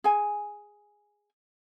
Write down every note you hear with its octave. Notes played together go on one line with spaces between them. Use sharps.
G#4 G#5